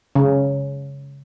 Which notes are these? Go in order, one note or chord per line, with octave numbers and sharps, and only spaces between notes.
C#3